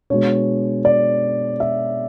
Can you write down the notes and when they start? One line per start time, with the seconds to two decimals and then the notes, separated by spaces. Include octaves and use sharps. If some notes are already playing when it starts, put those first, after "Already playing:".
0.10 B2 G#3 D4 C#5
0.85 D5
1.60 E5